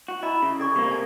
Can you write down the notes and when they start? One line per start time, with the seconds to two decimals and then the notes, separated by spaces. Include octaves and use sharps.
0.08 F#4
0.23 E4 D#5 A#5
0.42 C#3
0.60 A4 D5 C#6
0.76 C3 A#3 C#6
0.91 A5